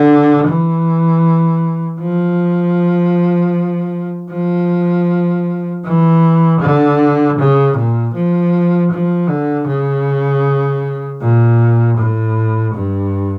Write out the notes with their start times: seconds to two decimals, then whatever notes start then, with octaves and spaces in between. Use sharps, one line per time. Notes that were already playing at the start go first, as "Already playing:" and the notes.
Already playing: D3
0.47 E3
2.00 F3
4.31 F3
5.85 E3
6.60 D3
7.38 C#3
7.76 A#2
8.14 F3
8.91 F3
9.29 D3
9.68 C#3
11.21 A#2
11.98 A2
12.74 G2